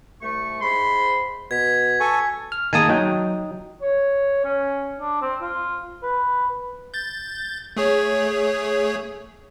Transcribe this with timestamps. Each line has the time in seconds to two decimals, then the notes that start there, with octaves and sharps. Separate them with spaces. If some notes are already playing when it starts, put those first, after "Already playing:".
0.21 C2 A3 C#6
0.61 G#2 B5 C6
1.51 B2 G#6 B6
2.00 A4 G#5 C#6
2.52 F6
2.73 D#3 A#3 G#4 G#5 A5 D#6
2.89 F#3 D#4 G5
3.82 C#5
4.44 C#4
5.00 D4
5.22 C4
5.42 F4
6.03 B4
6.94 G6 A6
7.77 A3 G#4 C#5